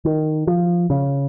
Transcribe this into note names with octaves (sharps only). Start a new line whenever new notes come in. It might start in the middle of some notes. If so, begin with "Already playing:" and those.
D#3
F3
C#3